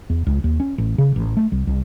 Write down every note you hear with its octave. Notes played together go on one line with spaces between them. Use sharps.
E2
C#2
D#2
C#4
A1
C#3
A1
A3
C2
C2